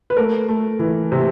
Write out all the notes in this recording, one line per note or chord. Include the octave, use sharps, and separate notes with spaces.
B4
A3 A#4
A3
E3
C3